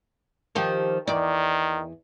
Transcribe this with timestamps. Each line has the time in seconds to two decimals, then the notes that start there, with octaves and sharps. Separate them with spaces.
0.55 D#3 F3 G4
1.07 E2 D#3 D5